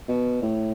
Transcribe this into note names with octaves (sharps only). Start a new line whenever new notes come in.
B2
A2